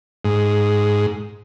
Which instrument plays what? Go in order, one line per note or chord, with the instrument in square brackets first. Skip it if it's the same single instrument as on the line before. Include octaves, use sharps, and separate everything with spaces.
[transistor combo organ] G#2